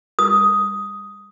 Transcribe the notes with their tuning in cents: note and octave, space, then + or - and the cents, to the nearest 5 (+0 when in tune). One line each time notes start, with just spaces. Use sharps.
D#6 +10